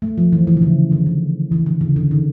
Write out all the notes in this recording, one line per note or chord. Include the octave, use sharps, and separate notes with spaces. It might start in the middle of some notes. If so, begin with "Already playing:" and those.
A3
F3
E3
E3
D3
C#3
D3
D#3
E3
D3
C#3
D3
D#3